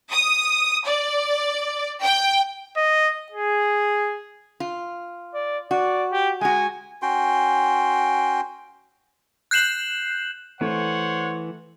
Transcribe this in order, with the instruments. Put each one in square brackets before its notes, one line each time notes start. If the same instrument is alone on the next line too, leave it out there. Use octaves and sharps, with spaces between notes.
[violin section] D#6
D5
G5
[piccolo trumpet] D#5
G#4
[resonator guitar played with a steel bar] F4
[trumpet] D5
[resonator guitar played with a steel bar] F#4 [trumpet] D5
[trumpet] G4
[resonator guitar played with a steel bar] G#3 F#4 [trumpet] G#5
[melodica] C#4 F#4 G5 C6
[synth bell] F#6 G6 C7 E7 F#7
[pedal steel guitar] E3 [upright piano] A3 [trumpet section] C5 C#5 F#5